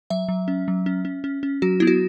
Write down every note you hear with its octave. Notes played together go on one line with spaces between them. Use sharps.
F#3 E5
F#3
C#4
F#3
C#4
C#4
C#4
C#4
F#3 F#4
B3 E4
F#4